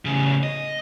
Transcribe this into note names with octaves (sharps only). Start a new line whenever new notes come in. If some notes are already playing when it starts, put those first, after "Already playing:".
A2 C#3
D#5